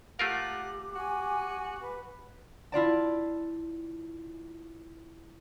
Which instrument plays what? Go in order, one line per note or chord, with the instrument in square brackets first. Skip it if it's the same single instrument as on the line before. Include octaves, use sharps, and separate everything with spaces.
[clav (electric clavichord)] A3 F4 A#4 [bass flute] G4 [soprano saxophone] F#5
[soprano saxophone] F#4 [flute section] G#5
[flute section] B4
[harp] E4 F4 D5 A5